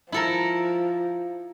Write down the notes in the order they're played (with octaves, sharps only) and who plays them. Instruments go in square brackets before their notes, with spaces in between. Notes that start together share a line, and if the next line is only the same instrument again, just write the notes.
[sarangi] F3 [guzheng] E4 A4 A#4